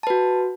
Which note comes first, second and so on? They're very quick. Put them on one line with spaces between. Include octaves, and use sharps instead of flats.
A5 B4 F#4